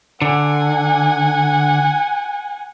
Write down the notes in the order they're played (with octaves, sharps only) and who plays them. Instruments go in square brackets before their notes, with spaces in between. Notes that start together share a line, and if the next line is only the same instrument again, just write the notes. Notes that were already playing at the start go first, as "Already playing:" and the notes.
[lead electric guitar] D3 [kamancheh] F#5 G#5